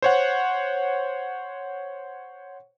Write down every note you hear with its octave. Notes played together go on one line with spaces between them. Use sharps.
C5 C#5 F#5